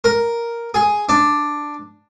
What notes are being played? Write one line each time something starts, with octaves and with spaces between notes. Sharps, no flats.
A#4
G#4
D4